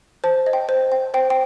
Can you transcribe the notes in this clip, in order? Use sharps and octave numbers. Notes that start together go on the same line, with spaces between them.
C5 A5
D#5
G5
C5
G5
C5 G5
G5